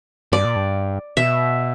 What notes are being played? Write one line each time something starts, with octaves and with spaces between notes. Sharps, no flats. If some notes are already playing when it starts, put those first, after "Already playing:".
G2 D5
A#2
G2
B2 E5